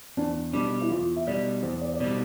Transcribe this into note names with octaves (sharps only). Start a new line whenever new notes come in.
E2 D4
B2 G3 D4
E4
E2 F4
E5
B2 G3 D5
E2 C5
C5
D5
D5
B2 G3 C5